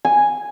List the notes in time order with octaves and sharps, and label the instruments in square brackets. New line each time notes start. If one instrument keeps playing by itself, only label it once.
[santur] G#5